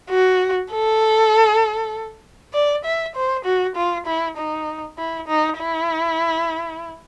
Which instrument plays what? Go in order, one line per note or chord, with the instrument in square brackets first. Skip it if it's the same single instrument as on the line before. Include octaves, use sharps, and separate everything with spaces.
[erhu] F#4
A4
D5
E5
C5
F#4
F4
E4
D#4
E4
D#4
E4